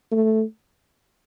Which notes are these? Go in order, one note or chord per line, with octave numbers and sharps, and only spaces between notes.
A3